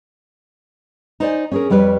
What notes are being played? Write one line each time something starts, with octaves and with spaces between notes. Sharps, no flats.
D#4 C5 D5 G#5
C#4 G#4 A#4
F2 G3 G4 B4 C#5 D5